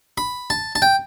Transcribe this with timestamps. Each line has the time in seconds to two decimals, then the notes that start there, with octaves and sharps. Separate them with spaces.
0.18 B5
0.50 A5
0.76 A5
0.82 G5